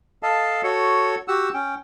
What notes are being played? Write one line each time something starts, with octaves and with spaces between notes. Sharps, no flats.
A4 D#5 F5 A5
F#4 A4 C#5
F#4 G4 F#5 E6
C#4 G5